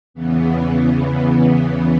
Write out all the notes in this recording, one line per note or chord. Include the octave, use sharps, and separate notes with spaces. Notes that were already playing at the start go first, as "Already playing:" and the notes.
E2 C#3 E3 B3